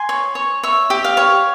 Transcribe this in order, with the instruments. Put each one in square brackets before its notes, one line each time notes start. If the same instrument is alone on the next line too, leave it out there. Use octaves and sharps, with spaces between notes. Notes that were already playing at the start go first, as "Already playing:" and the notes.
Already playing: [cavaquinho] G#5 C6
C#5
C#5
C#5 E5
G4
F5
C#5